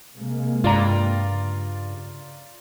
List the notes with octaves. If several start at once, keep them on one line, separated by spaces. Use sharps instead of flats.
C3 G#3 A#3
G2 F4 D5 A#5
C#3